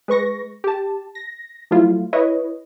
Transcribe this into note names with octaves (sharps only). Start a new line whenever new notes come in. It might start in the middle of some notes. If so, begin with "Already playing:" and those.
G#3 B4 C#6 A#6
G4 A5
A#6
F3 F#3 A3 E4 F4
E4 B4 C#5 D#5